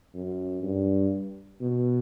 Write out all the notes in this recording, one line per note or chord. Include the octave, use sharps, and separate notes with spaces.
F#2
G2
B2